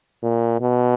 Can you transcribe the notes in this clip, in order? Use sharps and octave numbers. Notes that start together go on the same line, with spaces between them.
A#2
B2